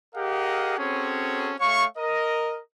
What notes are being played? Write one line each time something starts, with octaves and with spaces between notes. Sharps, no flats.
G4 G#4 A#4 D#5 F5 F#5
C4 C#4 F#4 G#4 A4 C#5
A3 C#5 F5 C#6
A#4 D#5